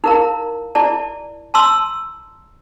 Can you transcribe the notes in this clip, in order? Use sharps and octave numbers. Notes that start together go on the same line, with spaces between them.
D#4 E4 A#4 F5 A#5
E4 D5 A5
A5 A#5 C6 E6